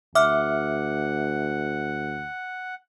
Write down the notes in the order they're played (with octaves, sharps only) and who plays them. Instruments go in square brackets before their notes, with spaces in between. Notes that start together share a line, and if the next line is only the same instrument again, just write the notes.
[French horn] D2 [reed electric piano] E5 [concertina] F#5 [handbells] D6 F6